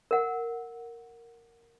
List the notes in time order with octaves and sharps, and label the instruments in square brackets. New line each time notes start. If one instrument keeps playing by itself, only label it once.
[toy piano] A#4 F#5